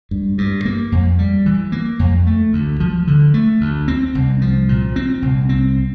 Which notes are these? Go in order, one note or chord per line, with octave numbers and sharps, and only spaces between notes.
G2
G2
A#3
F2
G3
E3
A#3
F2
A3
D2
F3
D3
A3
D2
C4
C2
F3
A#2
C4
C2
C4